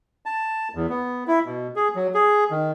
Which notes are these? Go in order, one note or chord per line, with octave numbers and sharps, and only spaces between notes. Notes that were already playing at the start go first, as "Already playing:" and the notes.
A5
E2
B3
E4
B2
G#4
F#3
G#4
D#3